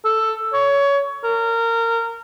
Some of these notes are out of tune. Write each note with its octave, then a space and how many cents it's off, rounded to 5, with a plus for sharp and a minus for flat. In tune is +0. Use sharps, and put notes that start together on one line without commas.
A4 +5
C#5 +20
A#4 -20